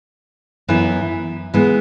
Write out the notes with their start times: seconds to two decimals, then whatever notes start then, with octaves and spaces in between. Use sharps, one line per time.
0.68 F#2 E3 B3 E4
1.54 E3 G#3 B3